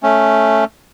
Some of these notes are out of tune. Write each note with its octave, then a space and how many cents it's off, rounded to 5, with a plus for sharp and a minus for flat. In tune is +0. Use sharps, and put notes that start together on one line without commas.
A3 +0 C#4 +0